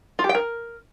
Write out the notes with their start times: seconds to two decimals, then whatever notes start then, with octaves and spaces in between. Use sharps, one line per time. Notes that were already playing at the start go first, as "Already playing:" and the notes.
0.19 F4
0.24 G4
0.29 G5
0.35 A#4